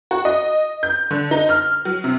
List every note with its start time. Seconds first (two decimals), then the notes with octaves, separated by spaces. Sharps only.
0.11 F#4
0.25 D#5
0.83 G6
1.11 D3
1.31 D#4
1.49 F6
1.85 F#3
2.04 C3